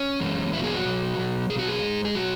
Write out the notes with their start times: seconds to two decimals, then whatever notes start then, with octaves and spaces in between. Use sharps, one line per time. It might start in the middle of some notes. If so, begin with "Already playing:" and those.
Already playing: C#4
0.20 F#2 E3 G#3
0.52 E2 B2 F#3 E4
0.64 G#4
0.74 F#4
0.85 B2 F#3
1.17 B2 F#3
1.50 B2 G#4
1.55 F#3 F#4
1.67 G#4
1.82 G#2 G#3
2.05 G#4
2.15 B2 F#3 F#4